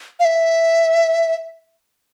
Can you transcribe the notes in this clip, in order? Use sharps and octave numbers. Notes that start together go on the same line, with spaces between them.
F5
E5